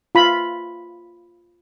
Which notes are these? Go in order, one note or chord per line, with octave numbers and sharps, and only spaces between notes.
F4 B5